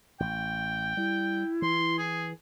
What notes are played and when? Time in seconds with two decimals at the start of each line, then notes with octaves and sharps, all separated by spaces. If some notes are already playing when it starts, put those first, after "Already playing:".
0.20 A1 G5
0.97 G3 E4
1.62 E3 C6
1.98 G#4